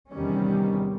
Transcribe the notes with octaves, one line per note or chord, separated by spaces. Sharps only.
E2 C3 D#3 G3 C#4